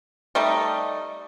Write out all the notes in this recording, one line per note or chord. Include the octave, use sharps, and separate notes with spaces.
G3 A3 D#4